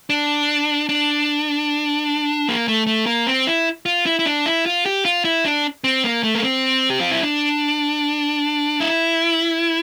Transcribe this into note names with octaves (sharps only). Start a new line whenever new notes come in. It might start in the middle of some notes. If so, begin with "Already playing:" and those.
D4
D4
A#3
A3
A3
A#3
C4
E4
F4
E4
E4
D4
E4
F4
G4
F4
E4
D4
C4
A#3
A3
A#3
C4
G4
F4
E4
D4
E4